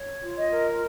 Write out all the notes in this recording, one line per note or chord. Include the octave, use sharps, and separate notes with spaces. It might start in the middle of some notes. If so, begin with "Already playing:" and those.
Already playing: C#5
F4
D#5
A#4